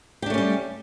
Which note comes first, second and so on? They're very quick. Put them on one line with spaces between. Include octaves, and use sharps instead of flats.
G4 D4 A3 C#4 G3